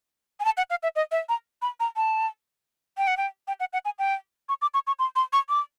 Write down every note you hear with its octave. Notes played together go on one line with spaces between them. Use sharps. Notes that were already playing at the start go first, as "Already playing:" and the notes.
G#5
A5
F#5
F5
E5
D#5
E5
A#5
B5
A#5
A5
G5
F#5
G5
G5
F#5
F#5
G#5
G5
C#6
D6
C#6
C#6
C6
C6
C#6
D6